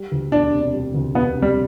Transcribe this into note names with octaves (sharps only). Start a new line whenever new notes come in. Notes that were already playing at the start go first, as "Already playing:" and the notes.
Already playing: G3
D2
E1 D4
C3
G3
D2
E1 B3
C3
G3